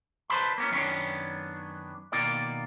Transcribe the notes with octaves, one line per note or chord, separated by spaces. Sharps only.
B4 C5 A5 B5 C6
A#3 B3 C#4
F#2 D#3 A#3 B3 C#4 D4
B2 D#3 A#3 F4 D5